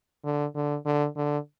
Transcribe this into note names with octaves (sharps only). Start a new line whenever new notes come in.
D3
D3
D3
D3